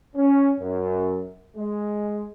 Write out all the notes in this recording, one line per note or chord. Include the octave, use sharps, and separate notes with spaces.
C#4
F#2
G#3